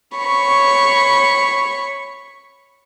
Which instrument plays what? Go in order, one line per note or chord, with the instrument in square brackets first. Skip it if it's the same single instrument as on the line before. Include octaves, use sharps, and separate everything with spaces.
[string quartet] C#5 B5 C#6